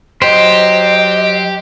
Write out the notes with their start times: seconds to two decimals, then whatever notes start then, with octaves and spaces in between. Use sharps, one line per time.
0.22 F#3 G4 C5 D#5